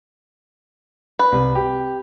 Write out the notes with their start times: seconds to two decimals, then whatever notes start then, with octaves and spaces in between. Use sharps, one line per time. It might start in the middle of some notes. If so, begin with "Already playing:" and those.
1.19 B4
1.32 C2
1.55 G4